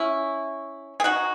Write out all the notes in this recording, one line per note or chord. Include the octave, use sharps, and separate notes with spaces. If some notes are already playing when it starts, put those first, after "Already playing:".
Already playing: C#4 E4
G#4
D#4 F#4